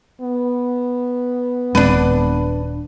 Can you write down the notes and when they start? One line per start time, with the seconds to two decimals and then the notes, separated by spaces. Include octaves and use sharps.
0.21 B3
1.75 D#1 G#3 C4 D4 B4